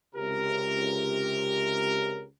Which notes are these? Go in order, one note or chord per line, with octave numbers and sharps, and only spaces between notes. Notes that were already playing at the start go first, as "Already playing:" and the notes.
C#2 C3 G4 A#4